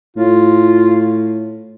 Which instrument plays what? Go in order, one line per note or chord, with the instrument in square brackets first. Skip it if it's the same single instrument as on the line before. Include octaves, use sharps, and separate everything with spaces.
[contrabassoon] A2 [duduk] F4